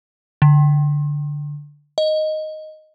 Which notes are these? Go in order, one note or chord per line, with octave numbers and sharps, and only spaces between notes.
D3
D#5